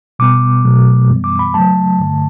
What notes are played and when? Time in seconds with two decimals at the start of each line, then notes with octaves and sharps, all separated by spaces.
0.19 B2 G3 B3 D6
0.64 B2 F#3 A3
1.09 F#2 E3 G3 B3
1.24 D6
1.39 B5
1.54 C#3 F#3 A3 A5
2.00 G2 D3 A3